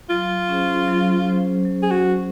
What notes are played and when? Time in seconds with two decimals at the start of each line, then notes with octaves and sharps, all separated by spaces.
0.10 F#3 F4
0.49 C#4 G#4 C5
0.88 F#3
1.27 C#4 G#4 C5
1.65 F#3
1.82 G#4
1.91 F#4
2.05 C#4 G#4 C5